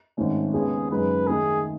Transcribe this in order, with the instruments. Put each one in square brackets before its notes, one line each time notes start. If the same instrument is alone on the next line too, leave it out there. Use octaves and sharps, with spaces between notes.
[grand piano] G#1 G#2 D#3 A3 C#4
[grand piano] D#2 C#3 G#3 B3 [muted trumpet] G#4
[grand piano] F#2 C#3 G#3 D#4 [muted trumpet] B4
[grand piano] D#2 D#3 A3 D#4 [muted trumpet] G#4